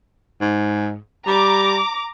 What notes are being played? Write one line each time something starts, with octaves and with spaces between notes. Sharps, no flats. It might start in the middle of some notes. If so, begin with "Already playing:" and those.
G#2
G3 A#5 D6